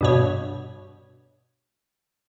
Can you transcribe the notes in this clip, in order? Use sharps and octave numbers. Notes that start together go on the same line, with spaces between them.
G2 B2 C#5